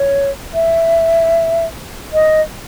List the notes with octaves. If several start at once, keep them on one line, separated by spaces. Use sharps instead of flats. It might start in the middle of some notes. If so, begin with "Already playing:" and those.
Already playing: C#5
E5
D#5